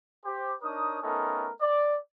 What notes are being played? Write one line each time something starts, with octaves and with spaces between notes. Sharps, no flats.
G4 C5
D4 D#4 A#4 C#5 D#6
A3 B3 C#4 D#4 A4 A#4
D5